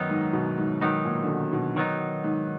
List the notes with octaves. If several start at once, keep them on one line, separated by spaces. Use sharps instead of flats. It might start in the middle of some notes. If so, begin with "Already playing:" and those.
Already playing: F#2 D#3 F#3 B3 D#4
G#2
B2
G#2
G#2 D#3 F#3 B3 D#4
A#2
D3
B2
B2
D#3 F#3 B3 D#4
G#2